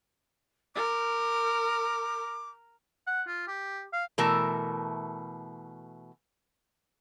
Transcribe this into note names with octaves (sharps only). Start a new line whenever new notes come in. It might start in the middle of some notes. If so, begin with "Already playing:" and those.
A#4 D6
F#5
F4
G4
F5
B2 E3 A3 A#4 A5